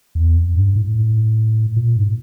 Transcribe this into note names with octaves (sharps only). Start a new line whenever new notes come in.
E2
F2
G2
A2
A#2
G#2